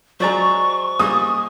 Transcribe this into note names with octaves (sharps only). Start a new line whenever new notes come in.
F#3 G#3 C5 D5 A#5 C#6
G3 G#3 A#3 D#6